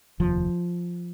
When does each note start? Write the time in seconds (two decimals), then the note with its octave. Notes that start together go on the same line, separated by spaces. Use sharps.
0.20 F1 D#2 F3